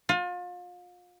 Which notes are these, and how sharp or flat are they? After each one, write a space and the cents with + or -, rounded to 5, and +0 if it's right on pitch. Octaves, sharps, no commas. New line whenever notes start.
F4 +35